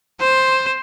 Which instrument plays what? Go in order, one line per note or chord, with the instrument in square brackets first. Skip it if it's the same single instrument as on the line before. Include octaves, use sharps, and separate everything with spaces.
[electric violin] C5